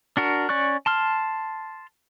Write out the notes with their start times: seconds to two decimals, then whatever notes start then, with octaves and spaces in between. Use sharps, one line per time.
0.17 D4 F#4 A#4
0.49 C#4 D5 C#6 F#6
0.86 A5 C6 F6